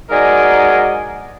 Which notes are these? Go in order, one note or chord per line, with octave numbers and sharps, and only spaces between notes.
G#2 F#4 A#4 D5 D#5 G#5